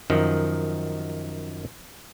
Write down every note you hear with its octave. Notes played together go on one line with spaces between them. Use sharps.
F#2 D#3 F3